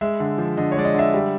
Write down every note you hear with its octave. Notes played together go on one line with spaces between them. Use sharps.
G#3 E5
D3
F3
D3 D#5
C#5
G#3 D5
D#5
D3 E5
G3